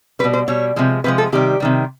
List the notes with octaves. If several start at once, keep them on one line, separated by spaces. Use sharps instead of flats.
B2 G3 B4
C5
B2 G3 C#5
C3 F3 G#3
C3 F3 G#3 B4
A4
C3 D#3 G3 G4
C3 D#3 G3